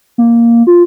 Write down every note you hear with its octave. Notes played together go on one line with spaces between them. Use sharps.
A#3
F4